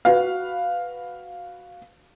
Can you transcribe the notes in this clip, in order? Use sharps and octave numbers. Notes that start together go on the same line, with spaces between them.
F#4 B4 F5